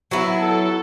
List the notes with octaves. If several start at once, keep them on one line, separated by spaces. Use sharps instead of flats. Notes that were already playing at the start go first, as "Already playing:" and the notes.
F#3 B3 E4
A4